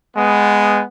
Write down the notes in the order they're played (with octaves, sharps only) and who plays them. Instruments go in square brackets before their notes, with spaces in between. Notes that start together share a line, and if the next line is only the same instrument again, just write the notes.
[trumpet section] G#3 B3